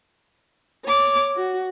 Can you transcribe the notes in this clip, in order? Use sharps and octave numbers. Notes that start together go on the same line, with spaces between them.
C#5 D6
F#4